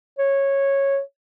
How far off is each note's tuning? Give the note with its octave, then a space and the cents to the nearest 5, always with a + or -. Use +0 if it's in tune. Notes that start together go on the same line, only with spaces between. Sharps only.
C#5 -10